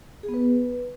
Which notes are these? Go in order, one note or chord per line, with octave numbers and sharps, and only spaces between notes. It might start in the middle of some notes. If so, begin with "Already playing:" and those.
G#4
B3
B4